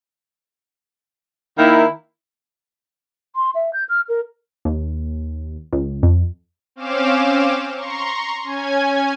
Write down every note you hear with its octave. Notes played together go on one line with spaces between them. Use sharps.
D#3 A#3 E4
C6
E5
G6
F6
A#4
D#2
C#2
F2
C4 C#4 F5 D6 E7
A#5 C6 C#6
C#4 G#5 G#6